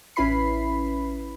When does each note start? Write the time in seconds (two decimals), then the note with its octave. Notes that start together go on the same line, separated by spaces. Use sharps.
0.16 A1 C#4 E4 B4 B5 C7